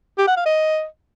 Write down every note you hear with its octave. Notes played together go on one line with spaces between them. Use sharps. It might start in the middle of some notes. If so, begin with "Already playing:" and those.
G4
F#5
F5
D#5